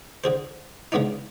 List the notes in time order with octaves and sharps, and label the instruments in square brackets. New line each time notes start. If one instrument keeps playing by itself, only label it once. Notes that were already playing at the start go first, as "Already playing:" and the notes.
[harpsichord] D3 G#4 C5
C#3 G#3 B3 D4 D#4